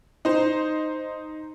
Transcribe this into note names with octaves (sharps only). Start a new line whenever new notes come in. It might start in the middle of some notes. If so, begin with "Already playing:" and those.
D#4 C5